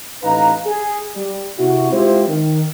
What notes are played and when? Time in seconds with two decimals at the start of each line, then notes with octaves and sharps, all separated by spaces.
0.23 A1 D#4 B4 F5 A#5
0.67 G#4
1.15 G3
1.58 C3 E4 F#4
1.92 G#3 C4 E4 F4 G4 C5
2.28 D#3